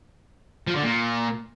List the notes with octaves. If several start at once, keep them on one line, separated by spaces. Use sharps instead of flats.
F3
D3
A#2